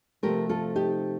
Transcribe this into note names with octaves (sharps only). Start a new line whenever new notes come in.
C3 F3 A3 G4 A#4
F4 A4
D#4 G4